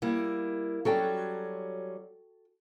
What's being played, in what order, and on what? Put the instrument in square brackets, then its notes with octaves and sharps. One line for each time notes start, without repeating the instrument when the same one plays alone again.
[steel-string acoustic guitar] G3 A#3 E4
[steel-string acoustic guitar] F#3 G3 C#4 [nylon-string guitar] F#4 A4 G5